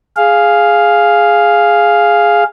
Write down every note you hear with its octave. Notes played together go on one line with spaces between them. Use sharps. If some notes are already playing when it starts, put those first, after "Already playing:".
G#4 F5